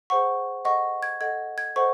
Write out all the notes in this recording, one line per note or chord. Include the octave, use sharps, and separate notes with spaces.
G#4 C5 F#5 C#6
A4 D#5 F#5 C#6
G#6
A4 D#5 F#5 G#6
G#6
A4 C5 D#5 F#5 C#6